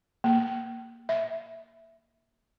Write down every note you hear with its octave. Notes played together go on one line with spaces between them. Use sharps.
A#3
E5